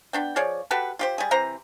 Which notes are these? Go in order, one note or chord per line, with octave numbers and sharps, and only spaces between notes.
B3 D4 G5
F3 G#4 C#5 D5
F#4 G4 A4 B4
F4 G4 C5
G3 G#4
C3 E3 C5 A#5